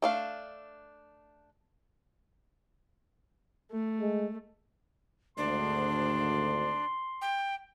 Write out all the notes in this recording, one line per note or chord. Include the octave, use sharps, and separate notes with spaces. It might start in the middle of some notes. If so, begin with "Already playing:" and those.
A3 D4 F5
A3
G#3
G#1 D2 D4 C6
G5